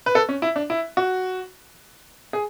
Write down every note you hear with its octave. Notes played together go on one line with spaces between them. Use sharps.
B4
A4
C#4
E4
D4
E4
F#4
G#4